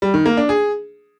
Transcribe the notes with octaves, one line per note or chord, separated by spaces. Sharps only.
G3
D#3
A#3
D4
G#4